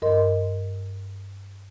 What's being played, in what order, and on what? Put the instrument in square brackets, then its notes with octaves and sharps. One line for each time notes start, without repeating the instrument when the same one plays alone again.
[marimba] G2 A#4 D#5 C6